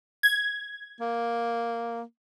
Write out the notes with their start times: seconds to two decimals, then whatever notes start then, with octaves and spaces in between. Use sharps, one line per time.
0.23 G#6
1.00 A#3